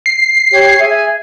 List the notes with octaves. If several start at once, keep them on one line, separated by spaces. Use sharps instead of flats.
C7
G4 C#5
G#4 E5 G#5